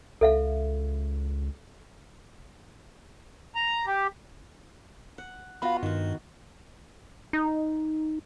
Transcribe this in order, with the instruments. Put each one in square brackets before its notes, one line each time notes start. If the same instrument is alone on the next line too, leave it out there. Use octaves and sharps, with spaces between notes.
[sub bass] C#2 [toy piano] A4 E5 F5
[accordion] A#5
G4
[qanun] F#5
[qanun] B3 F4 F#4 [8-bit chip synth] F5 B5
[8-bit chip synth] G2 [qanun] D#3 F#4
[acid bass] D#4